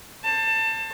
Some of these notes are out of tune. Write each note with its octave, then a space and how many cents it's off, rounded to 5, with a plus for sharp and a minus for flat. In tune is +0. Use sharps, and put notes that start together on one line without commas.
C5 +40 A5 +25